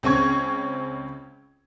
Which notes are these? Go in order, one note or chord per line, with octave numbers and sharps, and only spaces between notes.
C#2 C4 C#4 C#6 G#6